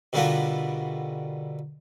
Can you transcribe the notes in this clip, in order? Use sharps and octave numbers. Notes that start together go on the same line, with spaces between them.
B2 D3 G3 A#3 B3 F4